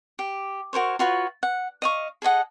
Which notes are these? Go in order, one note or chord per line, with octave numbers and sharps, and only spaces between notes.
G4
F#4 A#4 C5 C#5
F4 F#4 B4 C#5
F#5
D#5 F5 C#6
G#4 A4 D#5 F#5